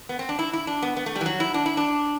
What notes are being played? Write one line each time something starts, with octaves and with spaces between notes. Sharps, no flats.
B3
C4
D4
E4
E4
D4
B3
B3
A3
G3
E3
F#3
E4
D4
E4
D4